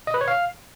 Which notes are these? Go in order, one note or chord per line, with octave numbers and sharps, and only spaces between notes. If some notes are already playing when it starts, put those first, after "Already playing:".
D#5
B4
C#5
F5